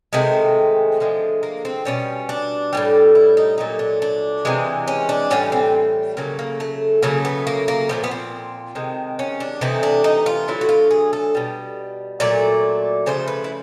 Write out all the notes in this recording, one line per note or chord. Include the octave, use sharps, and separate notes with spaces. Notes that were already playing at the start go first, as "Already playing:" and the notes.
C3 D#3 G#3 A3
D3 F3 G#3
A#3
C4
B2 G3 C#4
D4
A2 E3 G3
E4
D#4
A#2 F#3 A3 D#4
D4
D4
C3 E3 G#3
C#4
D4
A2 E3 G3 C#4
C4
C#3 F#3 A3 A#3
A#3
A3
C#3 F#3 A3 A#3
B3
A#3
A#3
A#2 F3 A3 B3
B3
C4
C3 D#3 G#3
C#4
D4
C3 E3 A3 D#4
D4
D#4
F4
D3 F#3 A3 E4
F#4
F4
G#4
A4
B2 G3
A#2 F#3 A3 D5
C#3 F3 A3 C5
B4
E4